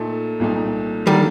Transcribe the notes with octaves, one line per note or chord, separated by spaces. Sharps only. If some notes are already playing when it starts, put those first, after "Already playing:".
Already playing: A#2 A3 D#4 A4
C2 A#2 A3 D#4
D3 D#3 F#3 G3 A#3